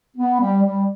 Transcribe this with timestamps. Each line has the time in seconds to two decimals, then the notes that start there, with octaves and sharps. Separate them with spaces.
0.17 B3
0.40 G3
0.63 G3